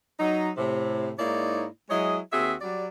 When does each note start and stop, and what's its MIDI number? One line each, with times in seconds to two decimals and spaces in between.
0.20 0.50 54
0.20 0.50 63
0.57 1.12 45
0.57 1.12 48
1.19 1.65 44
1.19 1.65 58
1.19 1.65 63
1.19 1.65 64
1.19 1.65 73
1.19 1.65 74
1.90 2.18 54
1.90 2.18 56
1.90 2.18 64
1.90 2.18 68
1.90 2.18 73
1.90 2.18 75
2.32 2.54 39
2.32 2.54 60
2.32 2.54 66
2.32 2.54 68
2.32 2.54 76
2.61 2.88 54
2.61 2.88 55
2.61 2.88 74